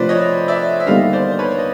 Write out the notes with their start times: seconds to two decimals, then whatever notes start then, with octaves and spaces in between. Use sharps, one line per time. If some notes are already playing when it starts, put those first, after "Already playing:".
Already playing: D2 C3 F3 B4 C5 D5
0.09 C#5 D#5
0.48 D5 E5
0.80 E5
0.87 D#2 D3 G3 B3 D#5 F5
1.13 C5 D5
1.31 C5
1.39 B4 C#5
1.58 D#5